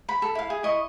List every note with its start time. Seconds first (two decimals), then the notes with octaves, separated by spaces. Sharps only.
0.09 B5
0.22 A4
0.35 E4 F5
0.50 G#4
0.63 E4 D#5 C#6